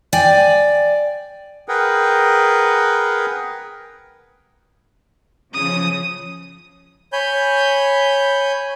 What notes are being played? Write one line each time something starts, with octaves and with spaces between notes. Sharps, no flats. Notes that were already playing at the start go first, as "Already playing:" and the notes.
D5 G5 G#5
G#4 A#4 B4 F#5 G5
C#3 F3 D#6
C#5 G#5 B5 G6